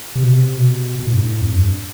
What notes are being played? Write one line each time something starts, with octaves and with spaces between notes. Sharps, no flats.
C3
B2
C3
B2
B2
A2
G2
A2
F2
G2